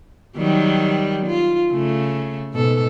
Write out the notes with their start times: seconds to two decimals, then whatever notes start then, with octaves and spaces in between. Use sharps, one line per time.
0.37 D#3 F#3 G3
1.27 F4
1.71 C#3 A3
2.53 G#2 B2 A4